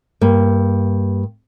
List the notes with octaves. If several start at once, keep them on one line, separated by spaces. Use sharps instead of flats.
G2 A#3